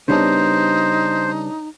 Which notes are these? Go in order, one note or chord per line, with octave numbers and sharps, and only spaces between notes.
C#3 G3 B3 D4 D#4 C5 C#5 A5